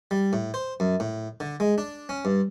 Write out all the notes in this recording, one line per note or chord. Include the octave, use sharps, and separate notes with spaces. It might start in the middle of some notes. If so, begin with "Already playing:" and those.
G3
A2
C5
F#2
A2
D3
G#3
D4
C#4
G2